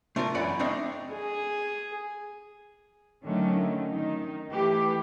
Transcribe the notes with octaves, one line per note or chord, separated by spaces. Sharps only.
A3 D4 F4 A4 A#4
F#2 E3 A#3 D5 F#5 B5
A3 C4 D4 D#4
G#4
D3 D#3 F#3 A3 C#4
D#3 D#4
E3 A3 G4 B4